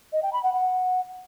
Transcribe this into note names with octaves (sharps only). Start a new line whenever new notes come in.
D#5
G5
B5
F#5
F#5